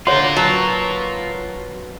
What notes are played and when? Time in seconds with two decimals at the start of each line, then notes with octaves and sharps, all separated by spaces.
0.07 D3 F4 F#4 A#4 C#5 C6
0.37 F#3 B4 A5 C#6